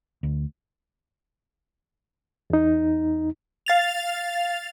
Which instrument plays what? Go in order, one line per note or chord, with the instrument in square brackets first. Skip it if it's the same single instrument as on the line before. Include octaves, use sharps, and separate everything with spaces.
[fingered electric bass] D2
[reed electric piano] E2 D#4
[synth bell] F5 A6 F7